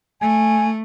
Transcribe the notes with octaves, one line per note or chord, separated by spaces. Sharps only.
A3 G#5